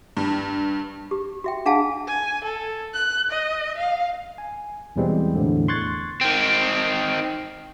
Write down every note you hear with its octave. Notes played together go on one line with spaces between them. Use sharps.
G2
G4
F#4 E5 G5
D4 G#4 F5 F#5 G#5 A5
G#5
A4
F#6
D#5
F5
G#5
E2 B2 E3 G3 G#3 C4
E2 A2 D3
C6 C#6 F#6 G#6 A6
D#3 C4